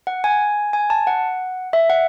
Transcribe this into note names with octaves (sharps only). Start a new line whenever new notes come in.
F#5
G#5
G#5
A5
F#5
E5
F#5